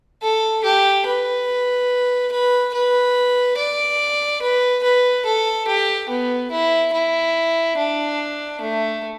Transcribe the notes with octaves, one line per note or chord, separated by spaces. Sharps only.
A4
G4
B4
B4
B4
D5
B4
B4
A4
G4
B3
E4
E4
D4
A3